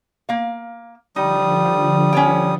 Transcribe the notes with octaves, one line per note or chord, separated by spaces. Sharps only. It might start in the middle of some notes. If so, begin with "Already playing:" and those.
A#3 F5
D3 F3 G3 D#4 D#6
C#4 C#5 G5